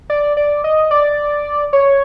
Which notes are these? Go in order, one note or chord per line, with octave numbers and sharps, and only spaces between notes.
D5
D5
D#5
D5
C#5